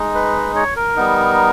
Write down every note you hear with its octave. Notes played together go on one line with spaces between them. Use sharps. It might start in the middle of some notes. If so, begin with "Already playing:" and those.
Already playing: G#3 D#4
B4
C#5
A#4
G3 B3 D#4